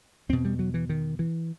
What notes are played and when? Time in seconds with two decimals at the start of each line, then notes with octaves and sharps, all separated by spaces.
0.29 E2 B2 C4
0.45 G3
0.59 F#3
0.74 E3
0.89 D#3
1.19 E3